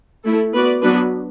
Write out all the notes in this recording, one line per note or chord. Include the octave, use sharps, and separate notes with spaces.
A3 E4 A4
B3 F#4 B4 D5
F#3 B3 D4 F#4 B4